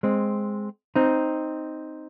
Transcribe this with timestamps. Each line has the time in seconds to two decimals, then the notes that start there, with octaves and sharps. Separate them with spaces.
0.03 G#3 C4
0.96 C4 D#4